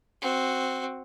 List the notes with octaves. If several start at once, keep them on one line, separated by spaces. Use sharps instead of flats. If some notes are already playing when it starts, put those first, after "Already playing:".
C4 F#4